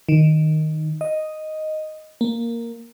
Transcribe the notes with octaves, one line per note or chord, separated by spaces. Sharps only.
D#3
D#5
A#3